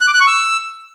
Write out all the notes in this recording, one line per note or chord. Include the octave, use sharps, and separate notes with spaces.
F#6
D6
F#6
C#6
E6